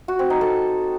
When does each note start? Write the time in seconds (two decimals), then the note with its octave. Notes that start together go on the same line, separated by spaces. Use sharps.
0.08 F#4
0.19 C4
0.30 D#4
0.41 A4